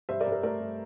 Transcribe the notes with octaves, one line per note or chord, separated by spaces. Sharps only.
G2 C5 E5
A#4 D5
G2
A#4
A3 A#4 D5
G2